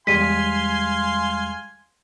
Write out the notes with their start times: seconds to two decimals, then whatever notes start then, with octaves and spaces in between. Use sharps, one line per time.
0.07 E2 G3 G#3 F5 G#5 C6 B6 D#7